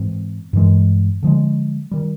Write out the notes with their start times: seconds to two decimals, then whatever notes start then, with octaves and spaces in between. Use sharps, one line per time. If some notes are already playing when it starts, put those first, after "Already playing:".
Already playing: G#2 E3 G#3 C4
0.53 G2 E3 G#3
1.23 D3 F3 G#3
1.91 D#3 G3